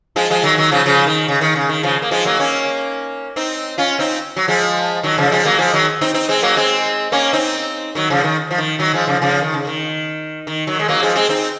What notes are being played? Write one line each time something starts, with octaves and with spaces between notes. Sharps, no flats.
F3 G#3
F3 G#3
D#3 F#3
D#3 F#3
C#3 F3
C#3 F3
D#3
C#3
D#3
C#3
D#3
C#3 F3
A#3
F3 G#3
F#3 A#3
A#3 C#4
C4 D#4
C#4 F4
C4 D#4
F#3
F3 G#3
D#3 F#3
C#3 F3
F3 G#3
F#3 A#3
F3 G#3
D#3 F#3
C4 D#4
C4 D#4
G#3 C4
F#3 A#3
G#3 C4
A#3 C#4
C4 D#4
D#3 F#3
C#3 F3
D#3
F3
D#3
D#3 F#3
F3 G#3
C#3 F3
C#3 F3
D#3
C#3
D#3
D#3
D#3 F#3
G#3
F#3 A#3
F3 G#3
G#3 C4
C4 D#4